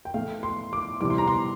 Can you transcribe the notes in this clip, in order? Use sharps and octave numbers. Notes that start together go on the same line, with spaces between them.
G5
A2 E3 A3 F5
C6
D6
C3 E3 G3 D6
C6
A#5
C6